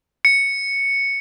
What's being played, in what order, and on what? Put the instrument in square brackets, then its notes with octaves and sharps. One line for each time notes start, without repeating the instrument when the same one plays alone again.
[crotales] C#7